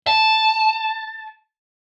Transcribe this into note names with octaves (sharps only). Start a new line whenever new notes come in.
A5